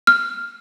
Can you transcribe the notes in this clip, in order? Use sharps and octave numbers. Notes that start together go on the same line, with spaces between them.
F6